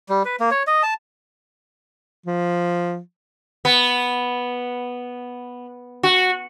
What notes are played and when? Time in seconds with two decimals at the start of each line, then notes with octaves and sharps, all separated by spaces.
0.09 G3
0.25 B4
0.40 A#3
0.51 C#5
0.67 D#5
0.83 A5
2.26 F3
3.65 B3
6.03 F#4